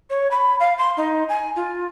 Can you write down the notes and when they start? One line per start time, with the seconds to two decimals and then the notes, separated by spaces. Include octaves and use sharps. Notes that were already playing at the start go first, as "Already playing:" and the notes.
0.10 C#5
0.31 B5
0.60 F5
0.78 C6
0.97 D#4
1.29 G#5
1.56 F4